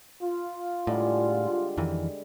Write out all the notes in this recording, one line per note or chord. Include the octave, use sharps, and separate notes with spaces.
F4
A2 D3 G3 G#3
F2 D#3 E3